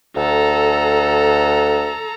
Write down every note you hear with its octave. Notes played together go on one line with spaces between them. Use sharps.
D2 A4 A#5